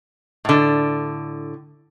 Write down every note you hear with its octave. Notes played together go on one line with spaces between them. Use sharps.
A2 D3